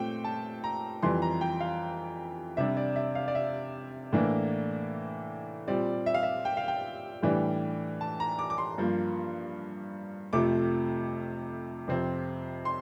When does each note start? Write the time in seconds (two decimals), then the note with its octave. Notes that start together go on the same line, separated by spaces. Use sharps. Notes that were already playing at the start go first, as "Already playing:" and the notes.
Already playing: A#2 A3 C4 G5
0.24 A5
0.64 A#5
1.02 F2 E3 G3 C6
1.22 A#5
1.41 G5
1.60 F5
2.57 C3 G3 D4 E5
2.77 D5
2.96 E5
3.15 F5
3.28 D5
3.35 E5
4.13 A2 E3 A#3 D4
5.67 A#2 G3 C4 D5
6.06 E5
6.14 F5
6.23 E5
6.45 G5
6.57 F5
6.68 G5
7.23 A2 E3 G3 D4
8.01 A5
8.20 A#5
8.39 D6
8.50 D6
8.58 C6
8.78 G2 F3 A#3
10.33 F2 C3 F3 A3 D6
11.88 F2 C3 F3 C4
12.65 C6